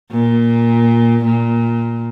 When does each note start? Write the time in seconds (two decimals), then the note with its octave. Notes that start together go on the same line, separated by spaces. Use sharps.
0.11 A#2
1.24 A#2